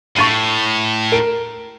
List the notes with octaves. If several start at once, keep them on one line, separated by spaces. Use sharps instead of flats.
A2 C#6 A6 D#7
A#4 D7